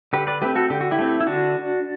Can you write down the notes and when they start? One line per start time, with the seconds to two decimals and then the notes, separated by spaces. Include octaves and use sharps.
0.13 D3 G4 B4
0.27 B4 D5
0.42 A3 C4 G4 B4
0.56 F#4 A4
0.70 D3 G4
0.81 F#4
0.91 E4 G4
0.99 A3 C4
1.21 E4
1.26 D3 D4 F#4